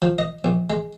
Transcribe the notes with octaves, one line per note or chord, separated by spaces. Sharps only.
F3
D#5
A#1
G#3